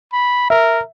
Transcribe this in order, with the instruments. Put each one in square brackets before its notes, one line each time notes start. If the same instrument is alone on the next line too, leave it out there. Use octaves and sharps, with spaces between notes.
[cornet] B5
[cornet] A#4 [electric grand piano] E5